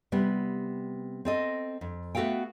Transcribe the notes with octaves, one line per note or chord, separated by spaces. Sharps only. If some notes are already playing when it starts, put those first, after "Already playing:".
C3 G3 B3
C4 A4 D#5
F2
A3 B3 F#4 A4 F5 G5